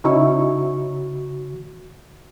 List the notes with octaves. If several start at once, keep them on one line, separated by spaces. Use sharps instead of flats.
C#3 C#4 D#4 E4 F#4 C#6